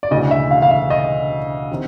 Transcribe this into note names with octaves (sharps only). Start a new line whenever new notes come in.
D5
E1 D2 C#3 E3 D#5
E5
F5
F5
E5
D#5
C3 D#3